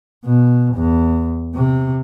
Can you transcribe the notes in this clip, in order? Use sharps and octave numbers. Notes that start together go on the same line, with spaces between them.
B2
E2
C3